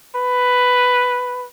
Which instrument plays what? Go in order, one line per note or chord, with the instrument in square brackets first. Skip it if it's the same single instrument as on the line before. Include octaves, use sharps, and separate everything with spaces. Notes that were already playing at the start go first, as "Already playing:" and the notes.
[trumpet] B4